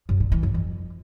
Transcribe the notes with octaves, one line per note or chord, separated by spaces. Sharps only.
F#2
D3
E3
F#2
F2